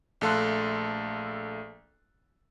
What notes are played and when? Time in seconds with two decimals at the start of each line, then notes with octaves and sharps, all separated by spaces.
0.21 A#1 A3 A4 F5 C6 F#6